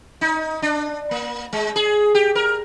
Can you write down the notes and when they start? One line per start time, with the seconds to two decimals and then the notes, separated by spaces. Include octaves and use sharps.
0.21 D#4
0.62 D4
1.11 A#3
1.53 G#3
1.76 G#4
2.15 G4
2.35 A#4